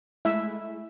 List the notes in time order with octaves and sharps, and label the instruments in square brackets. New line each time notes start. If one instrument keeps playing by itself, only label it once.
[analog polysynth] G#3 A3 E4 [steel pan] E5